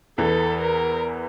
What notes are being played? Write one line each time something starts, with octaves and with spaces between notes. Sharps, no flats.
E2 E3 A4
A#4